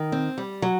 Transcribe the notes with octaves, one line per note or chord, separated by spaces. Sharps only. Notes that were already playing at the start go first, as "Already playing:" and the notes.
Already playing: D#3
C4
G3
F#3